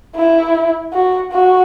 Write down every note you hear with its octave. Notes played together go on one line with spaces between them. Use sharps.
E4
F#4
F#4